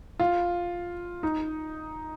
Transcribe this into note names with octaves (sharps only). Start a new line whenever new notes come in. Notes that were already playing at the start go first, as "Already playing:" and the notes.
F4
D#4